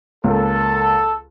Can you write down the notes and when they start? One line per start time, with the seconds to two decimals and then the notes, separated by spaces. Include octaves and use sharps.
0.24 C#2 A#3 A4